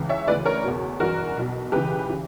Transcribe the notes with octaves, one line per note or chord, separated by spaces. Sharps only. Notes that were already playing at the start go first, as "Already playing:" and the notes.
Already playing: C#2 C#3 E3
C#5 E5
D2 C#3 E3 B4 D5
A#4 C#5
E2 B2
G1 F#2 E3 F#4 A#4
B1 B2
C#2 C#3 E3 G4 B4
C#3 E3